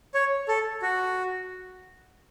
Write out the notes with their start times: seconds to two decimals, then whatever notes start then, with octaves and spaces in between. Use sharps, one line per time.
0.14 C#5
0.48 A4
0.82 F#4